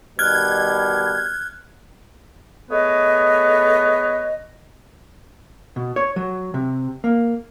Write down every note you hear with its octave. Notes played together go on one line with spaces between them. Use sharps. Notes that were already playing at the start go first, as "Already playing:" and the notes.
B2 D#3 G3 F6 F#6 G#6
A3 B3 G#4 B4 C#5 D#5
B2
C#5
F#3
C3
A#3